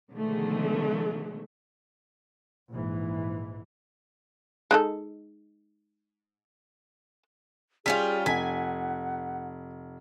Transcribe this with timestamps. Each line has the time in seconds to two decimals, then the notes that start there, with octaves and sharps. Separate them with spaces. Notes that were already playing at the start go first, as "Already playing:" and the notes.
0.11 B2 D3 D#3 F3 G#3 A3
2.70 A#1 G#2 E3
4.71 G#3 D#4 A4
7.86 G3 C#4 F4 G#4 B6
8.26 F1 F#5 G#5 B6